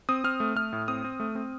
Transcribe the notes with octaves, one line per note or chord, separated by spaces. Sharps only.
C4 D#6
C4 F6
A3
A3 F6
A2
C4 D#6
C4
A3
C4